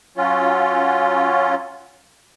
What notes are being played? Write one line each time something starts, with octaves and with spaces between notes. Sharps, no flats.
F#3 C#4 F4